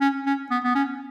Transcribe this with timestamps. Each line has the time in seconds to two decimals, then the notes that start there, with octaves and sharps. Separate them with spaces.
0.01 C#4
0.26 C#4
0.51 B3
0.64 B3
0.75 C#4